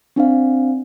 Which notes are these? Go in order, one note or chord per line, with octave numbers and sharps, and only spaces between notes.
C4 D4 C5 F5